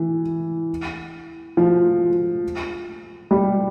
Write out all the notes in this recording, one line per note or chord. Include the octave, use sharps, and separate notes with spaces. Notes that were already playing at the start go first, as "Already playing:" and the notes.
Already playing: E3
F3
G3